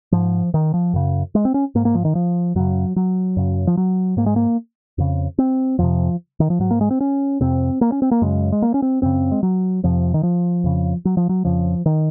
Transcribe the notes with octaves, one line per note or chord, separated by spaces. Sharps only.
G#2 F3
D#3
F3
F#2 C#3
G#3
C4
C#4
G#2 A#3
A#3
F3
D#3
F3
F#2 C#3 F#3
F#3
F#2 C#3
F3
F#3
G#2 A#3
G#3
A#3
F2 C#3
C4
F2 C3 F3
D#3
F3
G#2 F#3
A#3
G#3
C4
C#4
F2 C3 C4
A#3
C#4
C4
A#3
F#2 C#3 G#3
G#3
A#3
C#4
C4
F#2 C#3 C4
G#3
F#3
F2 C3 F3
D#3
F3
F2 C#3
F#3
F3
F#3
F2 C#3 F3
D#3